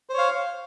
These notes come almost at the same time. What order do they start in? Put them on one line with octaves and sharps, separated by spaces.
C5 C#5 F5